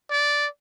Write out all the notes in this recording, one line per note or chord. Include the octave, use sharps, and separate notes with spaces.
D5